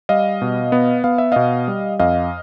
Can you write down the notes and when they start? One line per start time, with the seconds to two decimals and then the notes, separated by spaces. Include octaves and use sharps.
0.09 G3 D#5 F5
0.42 B2
0.72 B3
1.04 B3 F5
1.18 E5
1.32 B2 D#5 F5
1.68 G3
1.99 F2 D#5 F5